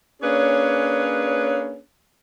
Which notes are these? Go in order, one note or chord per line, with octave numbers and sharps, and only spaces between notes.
A#3 C#4 D4 G#4 B4 C#5